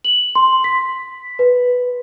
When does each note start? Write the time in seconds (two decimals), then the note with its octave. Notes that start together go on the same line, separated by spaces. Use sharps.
0.05 F#7
0.35 C6
0.64 B6
1.39 B4